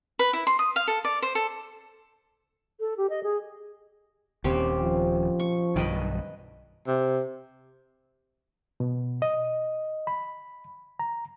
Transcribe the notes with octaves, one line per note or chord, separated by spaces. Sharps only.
B4
E4
C6
D#6
F5
A4
D5
C5
A4
A4
G4
D#5
G#4
D#1 D#2 C4 C#4 G4
F3
C#6
B1 G2 D#3 B4 D#5 G5
C3
B2
D#5
B5
A#5